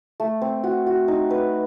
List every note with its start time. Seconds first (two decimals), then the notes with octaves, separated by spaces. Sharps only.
0.20 A3
0.42 C4
0.64 F#4
0.87 F#4
1.08 D#4
1.30 B4